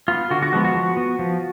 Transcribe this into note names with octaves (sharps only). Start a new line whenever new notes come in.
B3 F4
D3 F#4
F#4
F3 G#3 B3 F#4
F#4
F3
B3
F3